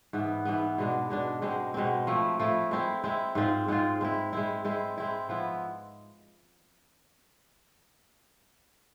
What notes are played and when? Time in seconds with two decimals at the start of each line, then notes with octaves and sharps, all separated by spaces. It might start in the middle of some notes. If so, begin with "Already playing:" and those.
0.13 G#2 E3 B3
0.45 G#2 E3 B3
0.78 B2 G#3 D4
1.10 B2 G#3 D4
1.42 B2 G#3 C4
1.74 B2 G#3 C4
2.07 F3 A3 E4
2.40 F3 A3 E4
2.71 G#3 C4 E4
3.04 G#3 C4 E4
3.35 G#2 G#3 C4 F4
3.68 G#2 G#3 C4 F4
4.01 G#3 C4 E4
4.33 G#3 C4 E4
4.64 G#3 C4 E4
4.98 G#3 C4 E4
5.29 F3 B3 E4